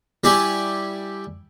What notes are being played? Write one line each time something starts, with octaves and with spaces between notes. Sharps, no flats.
G3 E4 G4 D5 G#5 C#6